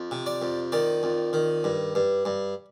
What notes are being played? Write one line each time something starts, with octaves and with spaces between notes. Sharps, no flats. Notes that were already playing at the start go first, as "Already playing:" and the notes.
Already playing: F2
C3
D5
F2
D#3 D5
F2
D#3
G2
G2
G2